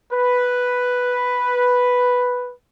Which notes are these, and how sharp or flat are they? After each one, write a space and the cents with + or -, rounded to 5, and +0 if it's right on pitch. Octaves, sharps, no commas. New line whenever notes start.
B4 +0